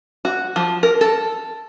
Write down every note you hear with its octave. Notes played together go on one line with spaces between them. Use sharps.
F#4
F3
A#4
A4